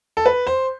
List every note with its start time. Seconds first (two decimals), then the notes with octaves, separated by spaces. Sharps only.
0.17 A4
0.26 B4
0.47 C5